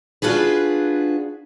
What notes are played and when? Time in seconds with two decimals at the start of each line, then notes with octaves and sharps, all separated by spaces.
0.22 D4 F4 F#4 G#4 B4